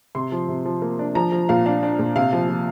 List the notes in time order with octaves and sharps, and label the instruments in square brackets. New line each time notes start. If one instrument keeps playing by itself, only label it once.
[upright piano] C3 C6
F3
C3
F3
A#3
D4
F3 A#5
F3
A#2 F5
D4 F5
D4
A#2
C3 F5
F3
F3